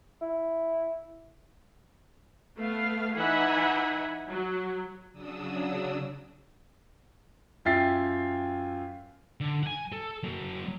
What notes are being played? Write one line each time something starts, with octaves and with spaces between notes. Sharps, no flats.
E4
A3 B3 F5
E3 D#4 E5 F#5 G#5 B5
F#3
C#3 F#3 D4 D#6 E6
F#2 F4 E5 G5 A6 C7
D3
F#5 G#5
A4
F#3 A#3